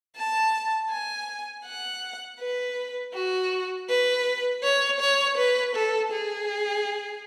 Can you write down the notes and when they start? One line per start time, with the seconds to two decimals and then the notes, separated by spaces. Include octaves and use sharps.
0.16 A5
0.90 G#5
1.65 F#5
2.40 B4
3.14 F#4
3.89 B4
4.64 C#5
5.01 C#5
5.37 B4
5.75 A4
6.12 G#4